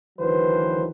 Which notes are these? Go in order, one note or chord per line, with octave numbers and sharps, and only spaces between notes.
D2 D#3 E3 F#3 B4 C5